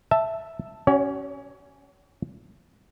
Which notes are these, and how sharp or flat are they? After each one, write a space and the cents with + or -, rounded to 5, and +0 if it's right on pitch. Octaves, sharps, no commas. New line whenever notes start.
E5 +0 A5 +0
C#4 +0 F#4 +40 C#5 +40